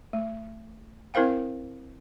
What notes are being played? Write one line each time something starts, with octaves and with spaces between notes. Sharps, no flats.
A3
C4 E4 A#4 C5 F5 G5